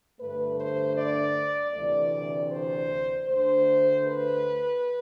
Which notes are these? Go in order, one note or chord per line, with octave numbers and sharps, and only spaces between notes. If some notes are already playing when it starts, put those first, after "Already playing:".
G2 D3 A3 B4
C5
D5
D2 C3 E3 A3 D5
C5
D2 D3 A3 C5
B4